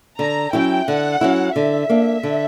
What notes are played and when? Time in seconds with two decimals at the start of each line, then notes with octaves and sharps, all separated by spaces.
0.19 D3 A#5
0.53 F#3 C#4 E4 G5
0.88 D3 F#5
1.21 F#3 C#4 E4
1.55 D3 E5
1.89 A#3 D4
2.23 D3